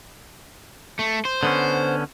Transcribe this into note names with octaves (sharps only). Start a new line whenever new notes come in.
A3
C5
D3 B3 C#4